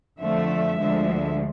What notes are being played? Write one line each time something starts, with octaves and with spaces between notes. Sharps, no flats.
F2 D3 F3 A3 E5
D2 D3 F3 G#3